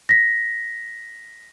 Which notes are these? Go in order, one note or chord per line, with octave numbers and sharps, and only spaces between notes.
A#6 B6